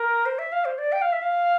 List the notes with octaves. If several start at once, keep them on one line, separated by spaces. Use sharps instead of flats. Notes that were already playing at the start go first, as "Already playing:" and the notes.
Already playing: A#4
C5
E5
F5
C5
D5
G5
F5
E5
F5